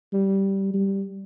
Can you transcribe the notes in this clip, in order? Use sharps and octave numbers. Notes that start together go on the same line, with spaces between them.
G3
G3